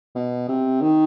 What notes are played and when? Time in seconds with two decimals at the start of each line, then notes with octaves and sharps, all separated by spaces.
0.15 B2
0.48 C3
0.82 D#3